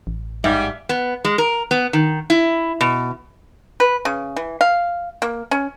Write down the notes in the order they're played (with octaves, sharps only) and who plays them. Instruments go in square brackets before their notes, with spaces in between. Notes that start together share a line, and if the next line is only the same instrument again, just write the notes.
[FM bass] A1
[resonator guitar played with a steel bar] G#2 [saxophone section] G3 [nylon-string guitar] E5 F5
[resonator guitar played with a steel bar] B3
G#3
A#4
B3
D#3
E4
B2
[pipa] B4
C#3
E3
F5
A#3
C#4